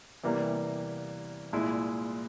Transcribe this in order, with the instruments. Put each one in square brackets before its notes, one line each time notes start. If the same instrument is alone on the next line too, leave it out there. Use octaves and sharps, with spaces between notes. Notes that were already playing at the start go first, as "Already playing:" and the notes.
[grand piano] E2 C3 E3 G3 A#3
C2 A#2 G#3 E4